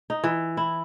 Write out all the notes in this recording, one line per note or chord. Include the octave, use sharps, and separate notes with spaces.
D#4
E3
E4